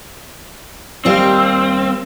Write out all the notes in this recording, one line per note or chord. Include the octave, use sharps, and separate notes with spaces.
D#2 G3 C4 F5